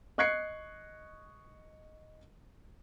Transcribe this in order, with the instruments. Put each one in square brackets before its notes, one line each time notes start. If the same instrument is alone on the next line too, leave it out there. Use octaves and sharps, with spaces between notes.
[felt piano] D#5 C#6 F#6 G#6 C7 C#7